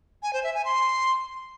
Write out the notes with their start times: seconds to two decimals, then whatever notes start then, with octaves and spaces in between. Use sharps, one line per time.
0.23 G#5
0.33 C5
0.44 E5
0.54 G#5
0.65 C6